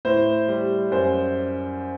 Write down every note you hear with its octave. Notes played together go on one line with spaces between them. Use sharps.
A2 C5
G3
F#2 C5